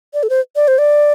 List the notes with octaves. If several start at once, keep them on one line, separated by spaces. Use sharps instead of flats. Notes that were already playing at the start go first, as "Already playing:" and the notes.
D5
A4
C5
D5
C5
D5